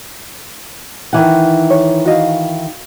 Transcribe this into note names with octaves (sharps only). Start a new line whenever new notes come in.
D#3 E3 F#5
C#5
F#4 D#5 F5